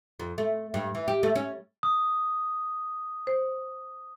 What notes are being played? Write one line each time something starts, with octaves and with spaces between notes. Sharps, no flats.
F2
A3
G2
E3
G4
A3
C#4
D#6
C5